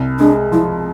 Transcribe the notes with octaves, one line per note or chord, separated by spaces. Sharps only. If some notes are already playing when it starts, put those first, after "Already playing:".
Already playing: C2
G#3 D4
F3 E4